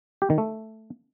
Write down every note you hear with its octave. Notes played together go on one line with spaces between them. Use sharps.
G4
D#3
A3